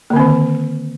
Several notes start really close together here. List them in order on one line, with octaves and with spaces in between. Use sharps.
A#3 D3 C4 D#3